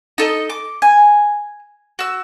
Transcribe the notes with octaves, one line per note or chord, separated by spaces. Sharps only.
D#4 A4 D#5
D6
G#5
F#4 E6